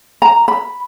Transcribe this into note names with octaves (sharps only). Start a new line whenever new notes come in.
A#5
B5